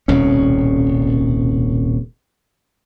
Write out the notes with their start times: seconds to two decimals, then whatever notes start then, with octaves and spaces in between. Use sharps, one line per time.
0.08 D#1 C2 B2 C#4